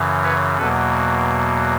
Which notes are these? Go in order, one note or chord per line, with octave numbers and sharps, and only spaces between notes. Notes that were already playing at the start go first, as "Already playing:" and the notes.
Already playing: F#2 C#3 E3
B4 C#5
E2 B2 F#3 A#3 A4 B4